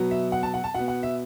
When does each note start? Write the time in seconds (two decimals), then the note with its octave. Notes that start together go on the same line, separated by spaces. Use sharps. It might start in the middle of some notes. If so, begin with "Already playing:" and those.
Already playing: B2 F#3 B3
0.11 E5
0.32 F#5
0.43 A5
0.54 F#5
0.64 A5
0.74 B2 B3 F#5
0.88 F#5
1.03 E5